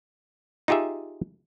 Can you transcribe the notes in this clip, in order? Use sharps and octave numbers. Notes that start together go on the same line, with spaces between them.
D#4 F4 G4 G#4 E5